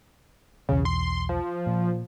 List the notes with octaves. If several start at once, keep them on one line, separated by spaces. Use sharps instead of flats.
B1 E2 C#3
C6
F3
A#2